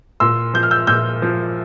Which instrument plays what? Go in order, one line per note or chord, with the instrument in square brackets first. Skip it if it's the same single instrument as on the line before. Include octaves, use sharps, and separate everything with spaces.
[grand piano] A#2 C6 E6
F3 G6
F6
E6 G6
A#2 E6 G6
F3